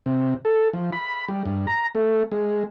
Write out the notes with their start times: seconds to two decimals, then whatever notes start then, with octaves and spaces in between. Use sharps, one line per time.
0.06 C3
0.45 A4
0.73 F3
0.93 B5
1.28 G3
1.45 G2
1.67 A#5
1.95 A3
2.32 G#3